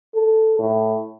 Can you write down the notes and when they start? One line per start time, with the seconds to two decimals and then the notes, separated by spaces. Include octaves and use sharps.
0.15 A4
0.59 A2